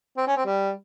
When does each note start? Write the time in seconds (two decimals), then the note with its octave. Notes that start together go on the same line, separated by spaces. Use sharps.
0.17 C4
0.27 C#4
0.36 C4
0.45 G3